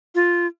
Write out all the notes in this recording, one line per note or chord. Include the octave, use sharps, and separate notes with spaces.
F4